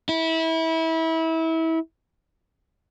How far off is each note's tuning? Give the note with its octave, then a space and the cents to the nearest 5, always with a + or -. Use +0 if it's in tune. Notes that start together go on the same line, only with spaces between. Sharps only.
E4 -25